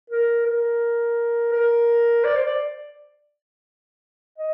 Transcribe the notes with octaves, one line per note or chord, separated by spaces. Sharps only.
A#4
A#4
A#4
D5
C5
D5
D#5